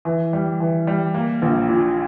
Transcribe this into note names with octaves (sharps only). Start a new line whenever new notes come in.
E3
G3
E3
G3
A#3
A#1
A#2